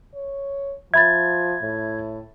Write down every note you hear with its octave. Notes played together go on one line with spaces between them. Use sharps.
C#5
F3 E5 B5 G#6 A6
A2